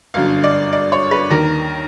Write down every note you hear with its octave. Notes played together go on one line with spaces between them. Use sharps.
G1 F#2 D3 F5
D5
D5
C#5
B4
D#2 D#3 A#4